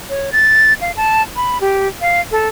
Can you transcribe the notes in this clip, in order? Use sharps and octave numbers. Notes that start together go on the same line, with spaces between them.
C#5
A6
F5
A5
B5
G4
F5
A4